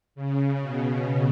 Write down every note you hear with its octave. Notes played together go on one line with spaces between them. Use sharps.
C#3
B2